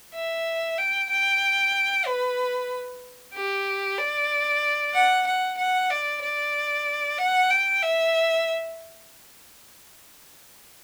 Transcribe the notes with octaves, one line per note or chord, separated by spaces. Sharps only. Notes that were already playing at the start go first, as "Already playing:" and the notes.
E5
G5
G5
B4
G4
D5
F#5
F#5
F#5
D5
D5
F#5
G5
E5